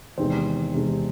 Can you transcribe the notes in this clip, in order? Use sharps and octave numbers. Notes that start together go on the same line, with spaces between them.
E2 C3 D#3 G#3 C4 C5
E2 C3 D#3 G#3